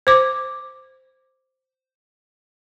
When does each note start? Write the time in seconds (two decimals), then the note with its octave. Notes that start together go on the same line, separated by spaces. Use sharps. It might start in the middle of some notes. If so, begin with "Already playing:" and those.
0.07 C5 D6